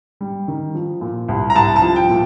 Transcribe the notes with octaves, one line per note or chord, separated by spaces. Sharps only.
G3
D#3
F3
A#2
C2
A#5
C2 A5
A5
F3
G5
A#2